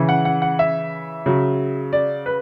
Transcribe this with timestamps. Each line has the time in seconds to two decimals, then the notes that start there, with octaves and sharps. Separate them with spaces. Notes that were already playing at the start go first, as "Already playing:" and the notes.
Already playing: C#3 E3
0.09 F#5
0.25 F#5
0.42 F#5
0.59 E5
1.26 C#3 F#3
1.93 D5
2.26 B4